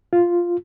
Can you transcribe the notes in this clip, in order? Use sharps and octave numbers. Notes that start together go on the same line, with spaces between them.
F4